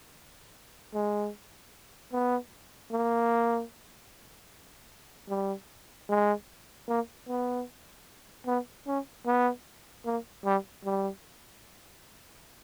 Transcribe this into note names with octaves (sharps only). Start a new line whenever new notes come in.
G#3
B3
A#3
G3
G#3
A#3
B3
B3
C#4
B3
A#3
G3
G3